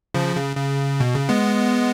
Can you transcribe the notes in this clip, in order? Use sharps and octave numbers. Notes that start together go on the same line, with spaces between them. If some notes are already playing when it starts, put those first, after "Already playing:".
C#3 F3
C#3
C#3
B2
C#3
G#3 B3